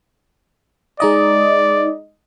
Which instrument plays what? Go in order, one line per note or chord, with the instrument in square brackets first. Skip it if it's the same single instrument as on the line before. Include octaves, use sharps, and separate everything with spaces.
[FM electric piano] G#3 D#4 D#5 [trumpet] D5